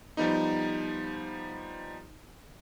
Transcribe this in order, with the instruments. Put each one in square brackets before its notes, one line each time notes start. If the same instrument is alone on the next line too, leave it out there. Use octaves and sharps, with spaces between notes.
[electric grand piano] F3 G3 B3 D#4